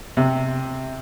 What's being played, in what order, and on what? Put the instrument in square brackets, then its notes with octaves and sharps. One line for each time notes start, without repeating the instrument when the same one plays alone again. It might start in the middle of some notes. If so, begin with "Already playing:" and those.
[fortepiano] C3